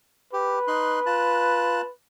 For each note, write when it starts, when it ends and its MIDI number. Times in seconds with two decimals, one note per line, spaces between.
0.33 0.59 67
0.33 1.91 71
0.68 1.00 63
0.68 1.00 84
0.68 1.00 90
1.06 1.81 65
1.06 1.81 81
1.06 1.81 90